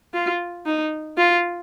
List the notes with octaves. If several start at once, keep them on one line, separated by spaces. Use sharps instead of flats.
F4
D#4
F4